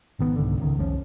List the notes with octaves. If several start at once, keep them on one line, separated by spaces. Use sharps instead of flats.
G#1 D#3 B3
C2 G#2 D3
C#2 D#3
F1 C2 F3 C#4